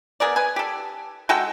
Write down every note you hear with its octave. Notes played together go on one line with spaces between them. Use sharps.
B3 G#4 A#4 D5
B4 G#5
G4 A4
G#3 F#4 A4 G5